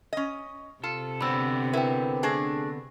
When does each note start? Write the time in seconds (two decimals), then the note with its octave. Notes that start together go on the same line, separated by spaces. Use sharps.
0.13 C#4 D#5
0.84 C3 F4 A4
1.21 D3 B3 C4 B5 E6
1.73 E4 A#4 B4 G5
2.23 A3 D4 G#4 A5 A#6